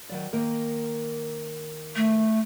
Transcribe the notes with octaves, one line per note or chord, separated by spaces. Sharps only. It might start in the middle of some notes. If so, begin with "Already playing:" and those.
D#3 F#3 D5
D#3 A#3 A#4
A3